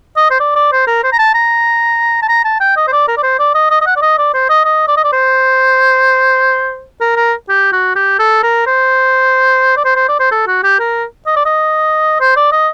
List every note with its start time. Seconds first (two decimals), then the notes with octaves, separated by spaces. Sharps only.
0.17 D#5
0.30 C5
0.40 D5
0.56 D5
0.72 C5
0.87 A#4
1.04 C5
1.12 A#5
1.19 A5
1.34 A#5
2.22 A5
2.29 A#5
2.45 A5
2.60 G5
2.77 D#5
2.88 C5
2.92 D5
3.08 A#4
3.18 D5
3.23 C5
3.39 D5
3.55 D#5
3.71 D#5
3.81 D#5
3.87 F#5
3.96 D5
4.02 D#5
4.18 D5
4.34 C5
4.50 D#5
4.65 D#5
4.88 D5
4.97 D#5
5.04 D5
5.13 C5
7.01 A#4
7.16 A#4
7.49 G4
7.73 F#4
7.96 G4
8.19 A4
8.43 A#4
8.67 C5
9.77 D5
9.85 C5
9.96 C5
10.09 D5
10.20 C5
10.32 A4
10.47 F#4
10.63 G4
10.79 A#4
11.26 D#5
11.36 D5
11.46 D#5
12.21 C5
12.37 D5
12.52 D#5